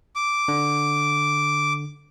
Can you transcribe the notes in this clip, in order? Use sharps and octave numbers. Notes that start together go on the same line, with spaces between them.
D6
D3